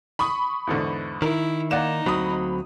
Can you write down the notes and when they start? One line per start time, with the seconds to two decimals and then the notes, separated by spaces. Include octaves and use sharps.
0.19 B5 C#6 D#6
0.67 E2 G#2 D3
1.22 D#3 E4 A#4
1.71 A#3 D#4 D5 F#5 E7
2.06 D2 F#3 C4 B5 D#6